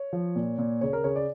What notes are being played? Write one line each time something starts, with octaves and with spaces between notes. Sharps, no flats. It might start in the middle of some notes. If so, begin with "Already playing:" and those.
Already playing: C#5
F3
A#2
A#2
C#3 C#5
A#4
C#3 C#5
D5